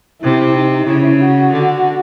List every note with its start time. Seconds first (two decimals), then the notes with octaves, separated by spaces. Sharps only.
0.22 C3 E4
0.55 D#4
0.87 C#3 E4
1.21 F#4
1.52 D3